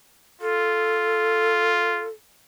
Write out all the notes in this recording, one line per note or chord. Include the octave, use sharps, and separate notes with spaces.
F4 A4